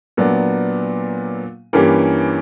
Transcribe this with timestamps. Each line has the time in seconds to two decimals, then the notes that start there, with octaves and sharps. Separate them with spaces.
0.17 A#2 F#3 B3 D4
1.73 G2 E3 A#3 C#4 G4